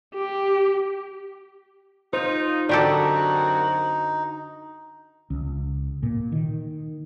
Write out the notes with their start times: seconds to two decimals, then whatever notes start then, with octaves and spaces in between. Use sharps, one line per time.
0.14 G4
2.13 D#4 F4 C5
2.69 F#2 D3 C4 D#4 F#4 G4 A4 D5
5.30 C#2
6.03 A#2
6.32 D#3